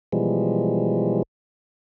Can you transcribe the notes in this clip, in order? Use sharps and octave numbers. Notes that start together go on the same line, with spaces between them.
B2 E3 F3 G3 G#3